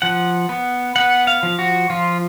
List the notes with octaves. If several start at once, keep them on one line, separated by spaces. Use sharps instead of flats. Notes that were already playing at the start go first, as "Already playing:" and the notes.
F3 F#5
B3
B3 F#5
F5
F3
F#4
F3 F4